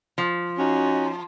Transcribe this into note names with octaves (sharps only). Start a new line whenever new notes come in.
F3
C#4 D#4 F#4